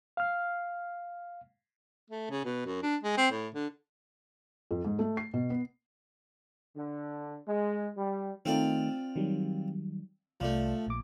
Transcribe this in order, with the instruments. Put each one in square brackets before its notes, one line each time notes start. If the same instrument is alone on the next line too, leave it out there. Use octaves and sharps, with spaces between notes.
[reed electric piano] F5 F6
[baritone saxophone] A3
C#3
B2
F#2
D4
G#3
C4
A2
D3
[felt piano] F2
G#2
A3
C7
B2
B3
[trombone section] D3
G#3
G3
[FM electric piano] D#3 A3 D#4 [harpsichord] C4 F4 D5
[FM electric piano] D#3 F#3 G3
[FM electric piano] C2 D5 [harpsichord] F3 A3
[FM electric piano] A#1 A#2 D6